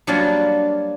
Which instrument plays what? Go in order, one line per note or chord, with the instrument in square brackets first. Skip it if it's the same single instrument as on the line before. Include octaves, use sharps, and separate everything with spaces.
[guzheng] F#3 G3 A#3 D4 F4 F#4